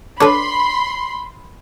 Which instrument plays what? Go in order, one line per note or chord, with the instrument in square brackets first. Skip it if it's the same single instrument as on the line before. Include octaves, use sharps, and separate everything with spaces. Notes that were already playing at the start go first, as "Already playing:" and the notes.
[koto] D4 B4 [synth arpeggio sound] A4 C#5 [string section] B5 C6